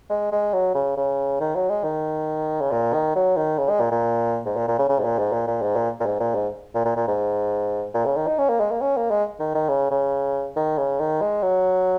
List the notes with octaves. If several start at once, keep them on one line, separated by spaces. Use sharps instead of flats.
G#3
G#3
F#3
C#3
C#3
D#3
F#3
G#3
D#3
C#3
A#2
D#3
F#3
D#3
C#3
G#3
A#2
A#2
G#2
A#2
A#2
C#3
C#3
G#2
A#2
G#2
A#2
A#2
G#2
A#2
A#2
G#2
A#2
G#2
A#2
A#2
A#2
G#2
A#2
C#3
D#3
D#4
C#4
A#3
G#3
A#3
C#4
A#3
G#3
D#3
D#3
C#3
C#3
D#3
C#3
D#3
G#3
F#3